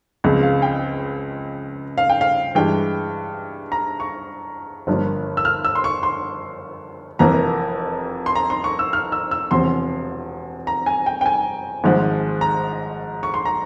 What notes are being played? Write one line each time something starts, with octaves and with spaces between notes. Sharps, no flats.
C#2 C#3 F3 G#3 C4
F5
G5
F5
G5
F5
G2 E3 G#3 G5
A#5
C#6
G1 G2 F3 A#3
E6
F6
E6
C6
C#6
C6
F1 F2 E3 A#3 A#5
C6
A#5
C6
C#6
E6
F6
E6
E6
E1 E2 C3 F3 C4 C6
A#5
G#5
G5
G5
G#5
G#1 G#2 F3
A#5
C#6
C6
A#5